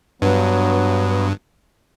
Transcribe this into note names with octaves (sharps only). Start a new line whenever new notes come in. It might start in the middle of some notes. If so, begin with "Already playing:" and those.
G2 F#3 B3